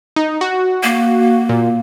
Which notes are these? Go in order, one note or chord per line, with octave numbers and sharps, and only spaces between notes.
D#4
F#4
A#3
A#2